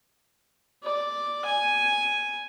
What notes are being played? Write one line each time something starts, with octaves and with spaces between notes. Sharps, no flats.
D5
G#5